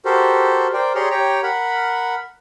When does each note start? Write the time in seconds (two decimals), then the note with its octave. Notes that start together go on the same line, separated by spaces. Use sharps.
0.05 F#4 G4 A4 A#4 C5
0.73 A#4 C5 D5 G5
0.95 G4 G#4 C#5 D5 A#5 C6
1.10 G4 C#5 G5 A#5
1.43 A#4 F#5 B5